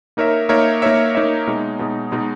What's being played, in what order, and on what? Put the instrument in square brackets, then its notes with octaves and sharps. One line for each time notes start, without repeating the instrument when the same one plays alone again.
[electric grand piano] A#3 D#4 A#4 C#5 E5
A#3 D#4 A#4 C#5 E5
A#3 D#4 A#4 C#5 E5
A#3 D#4 A#4 C#5 E5
B2 G#3 D#4
B2 G#3 D#4
B2 G#3 D#4